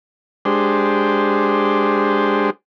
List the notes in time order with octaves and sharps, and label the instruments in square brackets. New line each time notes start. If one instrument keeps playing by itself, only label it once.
[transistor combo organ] G#3 D4 G4 C5